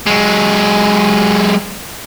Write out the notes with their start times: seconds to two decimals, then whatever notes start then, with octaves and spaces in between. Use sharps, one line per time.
0.06 F#3 G#3